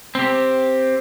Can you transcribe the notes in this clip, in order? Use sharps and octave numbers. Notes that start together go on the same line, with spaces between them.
C4 G4